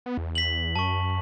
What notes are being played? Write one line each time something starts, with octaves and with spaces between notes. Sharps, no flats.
B3
E2
B6 F#7
F#2 A5 C#6